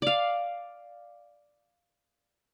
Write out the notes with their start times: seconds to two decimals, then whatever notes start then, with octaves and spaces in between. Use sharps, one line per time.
0.02 D5 F5